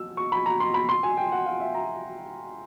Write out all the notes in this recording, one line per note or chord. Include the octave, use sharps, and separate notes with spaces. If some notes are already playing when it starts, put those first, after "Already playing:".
Already playing: E6
C#6
B5
A#5
C6
B5
C6
G#5
G5
F#5
F5
E5
A#5